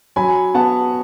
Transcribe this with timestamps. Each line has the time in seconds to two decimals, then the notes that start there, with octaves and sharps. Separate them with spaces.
0.16 F#3 G#5 B5
0.54 B3 F#5 A5